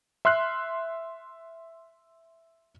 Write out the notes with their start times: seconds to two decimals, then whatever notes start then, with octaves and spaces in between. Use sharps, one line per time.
0.25 E5 C6 F6 F#6 C7